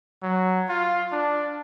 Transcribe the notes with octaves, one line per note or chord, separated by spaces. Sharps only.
F#3
F4
D4